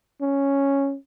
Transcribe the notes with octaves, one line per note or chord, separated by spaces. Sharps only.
C#4